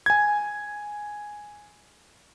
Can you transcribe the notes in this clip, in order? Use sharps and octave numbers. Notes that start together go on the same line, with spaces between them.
G#5 G#6